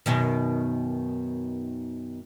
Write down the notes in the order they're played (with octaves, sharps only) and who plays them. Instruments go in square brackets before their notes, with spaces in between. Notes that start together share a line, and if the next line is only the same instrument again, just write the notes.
[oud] F#2 B2 D#3